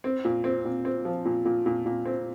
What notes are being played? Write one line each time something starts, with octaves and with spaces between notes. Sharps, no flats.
C4
A#2
C4
A#2
C4
F3
A#2
A#2
A#2
A#2
C4